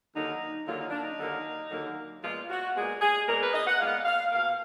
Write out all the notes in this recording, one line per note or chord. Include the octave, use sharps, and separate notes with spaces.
D#2 D3 F#3 A#3 D#4
D#2 D3 F#3 A#3 F4
D#4
D4
D#4
D#2 D3 F#3 A#3
D#2 D3 F#3 A#3
A#2 G#3 B3 F4
F#4
A#2 G#3 B3 G#4
G#4
A#2 G#3 B3 A#4
B4
D#5
F#5
A#2 G#3 B3 F5
F5
B2 A#3 F5